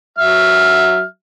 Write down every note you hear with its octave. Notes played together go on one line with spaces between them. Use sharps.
F#3 E5 F6